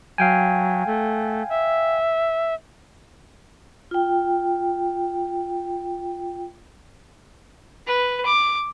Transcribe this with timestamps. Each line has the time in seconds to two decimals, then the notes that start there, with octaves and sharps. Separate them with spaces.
0.18 F#3 F5 G5 G#5
0.87 A3
1.49 E5
3.91 F4 G5
7.87 B4
8.26 D6